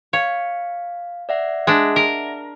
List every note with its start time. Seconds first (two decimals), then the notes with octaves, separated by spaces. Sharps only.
0.13 C#5 F5
1.29 D5 E5 F#5
1.67 G#3 D4
1.96 A#4